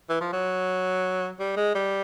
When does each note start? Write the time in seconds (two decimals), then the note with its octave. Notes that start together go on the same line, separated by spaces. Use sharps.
0.09 E3
0.21 F3
0.33 F#3
1.39 G3
1.56 G#3
1.75 G3